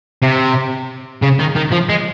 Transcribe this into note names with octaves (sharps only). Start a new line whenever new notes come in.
C3
C#3
D#3
D#3
F3
G#3